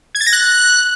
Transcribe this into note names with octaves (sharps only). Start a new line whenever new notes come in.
G#6
A6
A#6
F#6